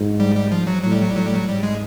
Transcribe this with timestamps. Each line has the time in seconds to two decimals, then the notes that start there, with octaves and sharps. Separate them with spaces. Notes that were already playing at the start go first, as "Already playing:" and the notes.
Already playing: G#2
0.20 G3
0.36 G3
0.51 F3
0.67 F#3
0.83 A2 F#3
0.92 G3
1.01 F#3
1.09 G3
1.15 A2 F#3
1.26 G3
1.34 F#3
1.48 G#2 G3
1.63 G#3